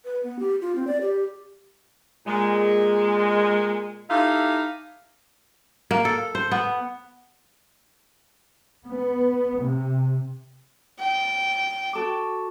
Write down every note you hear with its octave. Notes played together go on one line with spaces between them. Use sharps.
B4
B3
G4
F4
C4
D5
G4
A#2 G#3
D#4 E4 G4 A4 F5
A#3
A4
C5
B3
B3
C3
G5
F#4 A4 D6